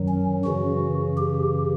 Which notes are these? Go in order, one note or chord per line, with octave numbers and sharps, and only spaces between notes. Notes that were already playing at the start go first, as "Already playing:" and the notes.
Already playing: F#2 D#3 F#3
C#4
F#2 C#3 E3 F#4
G4